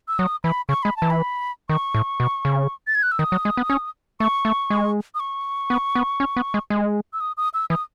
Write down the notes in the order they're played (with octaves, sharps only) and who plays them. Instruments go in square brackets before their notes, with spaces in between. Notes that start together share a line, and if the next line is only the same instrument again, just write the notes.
[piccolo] E6
[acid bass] F#3 [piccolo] D#6
[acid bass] E3 [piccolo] B5
[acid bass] C#3 [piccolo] C#6
[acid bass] G#3 [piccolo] B5
[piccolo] A5
[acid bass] E3
[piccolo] B5
[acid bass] D#3 [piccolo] C#6
[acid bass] A2
B2
C#3
[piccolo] A6
G#6
F#6
E6
[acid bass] D#3 [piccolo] D#6
[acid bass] F#3
G#3
B3
C#4
[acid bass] A3 [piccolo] C#6
[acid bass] A3
G#3
[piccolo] D#6
C#6
[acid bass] B3
B3
C#4
B3
G#3
G#3
[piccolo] E6
D#6
D#6
E6
[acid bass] E3 [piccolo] D#6